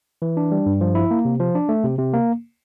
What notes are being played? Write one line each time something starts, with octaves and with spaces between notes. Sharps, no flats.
E3
D4
G3
G2
F3
E4
A#3
C3
F3
D4
A3
C3
C3
A#3